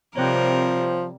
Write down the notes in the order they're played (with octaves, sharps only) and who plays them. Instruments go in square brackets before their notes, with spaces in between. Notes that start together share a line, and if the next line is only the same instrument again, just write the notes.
[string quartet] C3 G3 A#4 [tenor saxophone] F3 [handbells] C4 C5 C#5